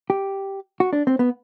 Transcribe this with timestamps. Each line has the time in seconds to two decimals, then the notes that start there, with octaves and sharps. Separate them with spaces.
0.10 G4
0.80 F#4
0.93 D4
1.07 C4
1.19 B3